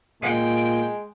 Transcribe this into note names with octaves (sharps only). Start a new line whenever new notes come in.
A#2 G#3 G5